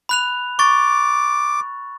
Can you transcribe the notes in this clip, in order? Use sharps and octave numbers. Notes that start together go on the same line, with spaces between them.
B5 F#6 F7
C#6 D6 A6